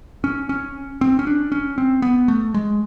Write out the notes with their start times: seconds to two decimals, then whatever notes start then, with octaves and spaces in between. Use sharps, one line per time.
0.24 C#4
0.49 C#4
1.01 C4
1.19 C#4
1.27 D4
1.52 C#4
1.78 C4
2.02 B3
2.28 A3
2.54 G#3